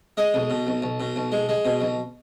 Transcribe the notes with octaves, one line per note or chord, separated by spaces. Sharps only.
G#3 D#5
B1
B2
B1
B1
B2
B1
G#3
G#3
B2
B1